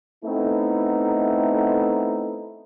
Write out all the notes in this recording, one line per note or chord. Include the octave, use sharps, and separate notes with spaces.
A3 B3 C4 D#4 E4 A4